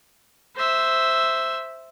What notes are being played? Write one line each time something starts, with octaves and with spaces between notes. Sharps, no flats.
C5 E5